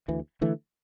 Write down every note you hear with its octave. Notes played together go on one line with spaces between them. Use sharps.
D2 E3
D3 E3 A3